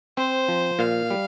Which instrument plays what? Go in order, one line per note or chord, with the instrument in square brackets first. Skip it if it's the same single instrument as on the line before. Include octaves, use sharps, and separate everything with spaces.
[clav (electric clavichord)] C4 [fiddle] C5
[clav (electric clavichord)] F3
[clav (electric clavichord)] A#2 [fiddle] F5
[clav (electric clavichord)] G3